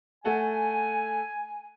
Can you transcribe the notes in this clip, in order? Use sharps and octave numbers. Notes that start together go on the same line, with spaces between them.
A3 F#5 G#5 A5